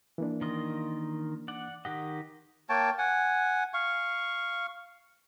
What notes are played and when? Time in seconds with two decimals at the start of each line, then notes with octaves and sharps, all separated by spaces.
0.18 E3 A#3 D4
0.41 D#3 F4 D#5
1.48 D5 F#5
1.85 D#3 G4 D#5 F#5
2.69 A#3 C#5 G5 A5
2.98 F#5 G#5
3.74 F5 C#6